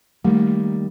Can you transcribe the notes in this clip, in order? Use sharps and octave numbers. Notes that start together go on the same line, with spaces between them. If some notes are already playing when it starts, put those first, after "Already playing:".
D#3 G3 A3 A#3